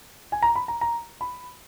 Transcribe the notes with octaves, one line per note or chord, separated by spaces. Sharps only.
G#5
A#5
B5
A#5
A#5
B5